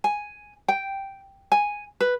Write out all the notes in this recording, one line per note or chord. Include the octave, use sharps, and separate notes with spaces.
G#5
G5
G#5
B4